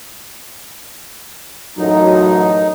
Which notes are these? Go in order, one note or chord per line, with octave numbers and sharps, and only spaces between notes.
A1 F#2 F#3 D#4